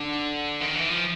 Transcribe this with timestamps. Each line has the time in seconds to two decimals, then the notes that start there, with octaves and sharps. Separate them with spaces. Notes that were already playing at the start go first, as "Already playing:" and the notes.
Already playing: D3
0.61 D#3
0.75 E3
0.89 F3